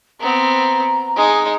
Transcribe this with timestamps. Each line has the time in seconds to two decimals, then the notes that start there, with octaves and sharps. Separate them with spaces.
0.21 B3 C4 A#5
1.16 G#3 D#4